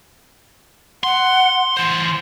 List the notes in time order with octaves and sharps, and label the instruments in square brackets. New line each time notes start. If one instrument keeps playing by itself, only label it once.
[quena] F#5 [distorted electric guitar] C6
[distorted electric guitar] E3 C5 [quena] C6